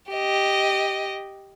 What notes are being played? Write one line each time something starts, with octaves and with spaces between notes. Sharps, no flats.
G4 D#5